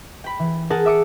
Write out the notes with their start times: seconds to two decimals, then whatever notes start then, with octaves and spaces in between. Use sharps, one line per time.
0.24 G5 B5
0.39 E3
0.70 G#4 A#4 F#5 A5 D#6
0.86 E5 D6 D#6 C#7 D#7